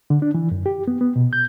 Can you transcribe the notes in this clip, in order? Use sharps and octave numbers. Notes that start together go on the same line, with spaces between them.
D3
D4
E3
F#2
G4
B3
B3
B2
G6